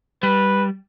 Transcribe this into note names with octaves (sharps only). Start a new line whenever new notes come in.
G3 B4